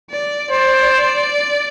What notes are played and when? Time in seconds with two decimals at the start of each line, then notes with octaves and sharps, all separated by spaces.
0.10 D5
0.51 C5 D5